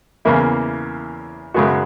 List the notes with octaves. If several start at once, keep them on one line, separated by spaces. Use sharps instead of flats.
E2 C#3 E3 A#3 E4
F#2 C#3 G#3 B3 F#4